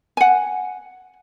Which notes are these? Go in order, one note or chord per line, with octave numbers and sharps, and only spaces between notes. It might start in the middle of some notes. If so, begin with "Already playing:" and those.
F#5 G#5